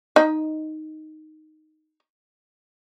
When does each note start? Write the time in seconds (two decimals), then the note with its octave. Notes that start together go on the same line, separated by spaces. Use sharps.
0.16 D#4 D#5